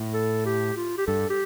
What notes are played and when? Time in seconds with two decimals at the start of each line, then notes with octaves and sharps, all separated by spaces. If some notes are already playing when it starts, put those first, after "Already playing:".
Already playing: A2
0.14 A4
0.46 G4
0.77 F4
0.98 G4
1.07 G2 A4
1.30 G4